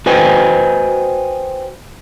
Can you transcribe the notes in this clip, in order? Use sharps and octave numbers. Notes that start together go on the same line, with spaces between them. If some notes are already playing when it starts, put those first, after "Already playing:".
F#4 B4 C5 D#5 G5 G#5